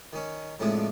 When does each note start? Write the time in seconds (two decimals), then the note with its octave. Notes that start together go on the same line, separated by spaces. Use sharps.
0.13 D#3 C#4
0.60 A2 C3 F3 G#3 D4